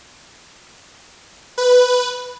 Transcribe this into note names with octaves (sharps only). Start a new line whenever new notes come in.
B4